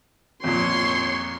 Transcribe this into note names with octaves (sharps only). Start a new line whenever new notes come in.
F2 A#2 C#5 C6